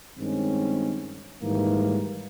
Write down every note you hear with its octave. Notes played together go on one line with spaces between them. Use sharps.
G2 D#3 G#3 C4 C#4
G#2 D#3 E3 G3 A#3